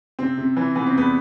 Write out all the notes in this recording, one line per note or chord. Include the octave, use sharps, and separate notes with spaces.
C3 C4
C3
E3
E3 B3
C4
E2 B3